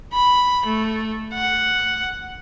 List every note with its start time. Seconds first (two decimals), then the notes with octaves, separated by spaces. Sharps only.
0.13 B5
0.66 A3
1.33 F#5